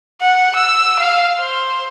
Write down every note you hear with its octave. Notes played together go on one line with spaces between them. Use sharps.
F#5
E6
F5
C5